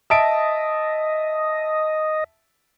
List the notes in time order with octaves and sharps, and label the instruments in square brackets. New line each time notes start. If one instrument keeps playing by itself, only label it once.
[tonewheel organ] D#5 [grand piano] E5 A5 D7